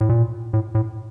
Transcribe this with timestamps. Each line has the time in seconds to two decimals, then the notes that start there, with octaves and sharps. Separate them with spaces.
0.01 A2
0.09 A#2
0.53 A2
0.75 A2